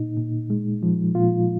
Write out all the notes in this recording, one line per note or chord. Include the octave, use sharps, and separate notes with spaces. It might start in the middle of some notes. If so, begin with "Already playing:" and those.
Already playing: A#2 D#4
A#2
G#3
F3
A#2 F4